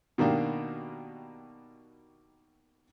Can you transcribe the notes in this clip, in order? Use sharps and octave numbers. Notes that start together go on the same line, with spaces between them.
B2 D#3 A#3 D4 G4